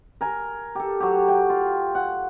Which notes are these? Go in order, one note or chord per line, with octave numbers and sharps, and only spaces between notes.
A#4 G#5
G4 A4
F#3 G4
G5
F4
F#5